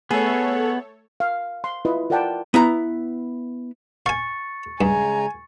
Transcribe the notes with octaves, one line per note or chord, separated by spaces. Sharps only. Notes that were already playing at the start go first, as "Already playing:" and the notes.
A3 B3 G#4 A4 C#5
F5
C6
E4 F4 B4 D#5
F4 A#4 D5 F#5 G5 A5
B3 E4 A#5
F5 G#5 C#6 A6 C#7
G2 C#3 G#3 G#5 A#5